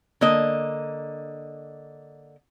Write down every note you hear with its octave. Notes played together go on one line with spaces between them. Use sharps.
D3 A#3 D#5